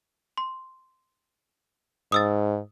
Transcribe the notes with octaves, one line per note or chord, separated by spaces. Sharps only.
C6
G#2 D#6 E6 A6